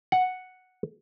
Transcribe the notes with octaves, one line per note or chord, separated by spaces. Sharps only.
F#5